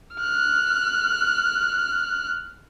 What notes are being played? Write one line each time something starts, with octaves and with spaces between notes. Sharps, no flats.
F6 F#6